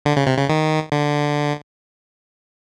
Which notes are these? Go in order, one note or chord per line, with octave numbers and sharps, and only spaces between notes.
D3
C#3
C3
C#3
D#3
D3